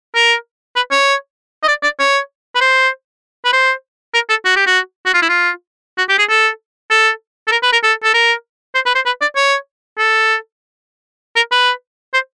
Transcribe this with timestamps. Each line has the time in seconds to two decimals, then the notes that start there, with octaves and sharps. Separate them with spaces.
0.15 A#4
0.76 B4
0.91 C#5
1.63 D#5
1.68 D5
1.83 D5
1.99 C#5
2.55 B4
2.61 C5
3.45 B4
3.52 C5
4.14 A#4
4.29 A4
4.45 F#4
4.56 G4
4.67 F#4
5.06 F#4
5.14 F4
5.22 E4
5.29 F4
5.98 F#4
6.09 G4
6.18 G#4
6.29 A4
6.90 A4
7.47 A4
7.51 A#4
7.63 B4
7.72 A#4
7.83 A4
8.03 A4
8.14 A#4
8.74 C5
8.86 B4
8.95 C5
9.06 B4
9.21 D5
9.36 C#5
9.98 A4
11.36 A#4
11.51 B4
12.14 C5